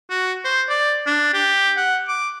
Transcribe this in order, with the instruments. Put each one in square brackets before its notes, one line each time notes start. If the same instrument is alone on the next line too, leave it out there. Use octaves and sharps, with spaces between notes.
[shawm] F#4
C5
D5
D4
G4
F#5
D6